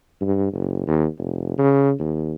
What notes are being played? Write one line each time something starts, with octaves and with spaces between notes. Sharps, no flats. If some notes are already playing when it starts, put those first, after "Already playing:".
G2
F#1
D#2
F1
C#3
D#2